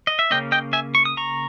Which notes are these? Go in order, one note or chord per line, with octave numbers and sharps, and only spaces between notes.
D#5
E5
C#3 G3 A#3 C#4 D#5 G5
D#5 G5
E5 G#5
C#6
D#6
A#5 C#6